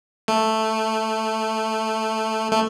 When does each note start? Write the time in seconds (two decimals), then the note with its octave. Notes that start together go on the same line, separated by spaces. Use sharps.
0.28 A3
2.51 A3